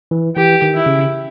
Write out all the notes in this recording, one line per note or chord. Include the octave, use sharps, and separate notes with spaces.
E3
E3 G4
D#3
E4
C#3